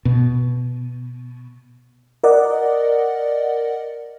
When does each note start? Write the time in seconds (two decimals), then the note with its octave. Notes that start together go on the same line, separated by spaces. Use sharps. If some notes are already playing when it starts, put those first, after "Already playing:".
0.05 B2
2.24 A#4 D5 D#5 F#5